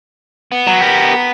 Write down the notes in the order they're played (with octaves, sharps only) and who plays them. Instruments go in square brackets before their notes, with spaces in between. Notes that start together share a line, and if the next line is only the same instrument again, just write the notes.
[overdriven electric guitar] B3
[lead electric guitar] F#3
G4 A#4